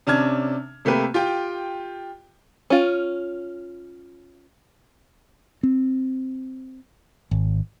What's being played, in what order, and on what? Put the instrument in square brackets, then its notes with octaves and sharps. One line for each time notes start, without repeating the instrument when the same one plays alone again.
[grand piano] C3 C#4 D4 A5 F6 G#6
C3 A3 A#3 G4 B4
F4 G4 G5
[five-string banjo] C#4 F4
[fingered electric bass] C4
G#1